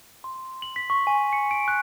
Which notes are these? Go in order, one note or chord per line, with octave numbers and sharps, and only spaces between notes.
C6
F#7
B6
C#6
G#5
C#7
D7
F#6